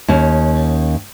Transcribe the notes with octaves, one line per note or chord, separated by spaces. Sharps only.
D#2 C#4